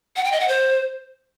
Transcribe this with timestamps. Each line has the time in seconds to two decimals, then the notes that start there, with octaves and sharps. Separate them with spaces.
0.16 F#5
0.24 G5
0.32 D#5
0.40 F#5
0.48 C5